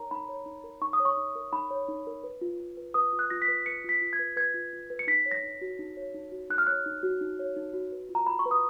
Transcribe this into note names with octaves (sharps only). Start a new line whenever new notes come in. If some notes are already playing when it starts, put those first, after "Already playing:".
Already playing: D#4 A#4 C#5 A#5
D#4 B5
C#5
D#4
A#4
D#4 C#6
D#6
C#5
C#6
D#4
A#4
D#4 B5
C#5
D#4
A#4
B4
F4
F4
B4
B4 D#6
F4
F#6
F4 A#6
B6
B4
B4 C#7
F4 B6
F4
G#6
B4
B4 G#6
F4
F4
B4
C#7
D#4 B6
C#5
A#6
D#4
F#4
D#4
C#5
D#4
F#4
D#4 F#6
F6
C#5 F#6
D#4
F#4
D#4
C#5
D#4
F#4
B4
F4
A#5
F4 B5
C#6
B4
D#6